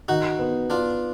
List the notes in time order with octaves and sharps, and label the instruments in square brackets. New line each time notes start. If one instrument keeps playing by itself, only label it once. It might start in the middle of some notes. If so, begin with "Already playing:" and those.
[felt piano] D#3 [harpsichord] D#4 F#4
[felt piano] B3
[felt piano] B3 [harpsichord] D4 F4